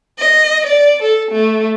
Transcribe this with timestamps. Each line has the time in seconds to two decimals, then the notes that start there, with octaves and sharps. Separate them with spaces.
0.19 D#5
0.66 D5
1.03 A4
1.32 A3